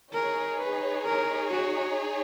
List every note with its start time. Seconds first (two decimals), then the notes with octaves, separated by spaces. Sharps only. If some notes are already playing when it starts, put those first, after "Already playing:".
0.13 D#4 G#4 A#4 C#5
0.59 B4
1.05 A#4
1.51 F#4